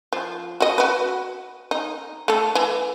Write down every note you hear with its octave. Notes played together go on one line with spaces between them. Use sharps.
F3
F#4 D#5
F#4 B4
D#4
A3 A4
E3